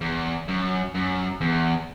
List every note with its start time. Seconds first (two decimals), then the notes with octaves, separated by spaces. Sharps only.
0.01 E2
0.48 F#2
0.94 F#2
1.41 E2